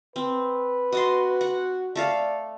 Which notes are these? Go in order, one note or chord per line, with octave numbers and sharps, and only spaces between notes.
C4 B4
F#4 D#5 A5 C6
F#5
A3 A4 D5 F5